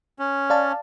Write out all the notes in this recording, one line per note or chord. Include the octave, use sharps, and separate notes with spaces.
C#4
D5 F5 A5